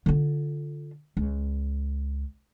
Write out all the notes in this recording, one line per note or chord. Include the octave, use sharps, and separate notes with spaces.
D3 F4
C#2